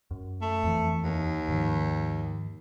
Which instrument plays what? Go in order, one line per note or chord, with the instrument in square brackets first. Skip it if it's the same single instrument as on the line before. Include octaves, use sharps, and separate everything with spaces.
[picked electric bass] F#2
[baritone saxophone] A3
[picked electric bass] F2 E3
[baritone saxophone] D#2
[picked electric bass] G#2 D#3 F3